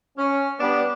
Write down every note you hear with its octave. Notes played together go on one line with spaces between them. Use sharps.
C#4
G3 B3 D4